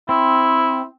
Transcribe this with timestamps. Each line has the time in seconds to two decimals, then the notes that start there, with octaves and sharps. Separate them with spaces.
0.09 C4 E4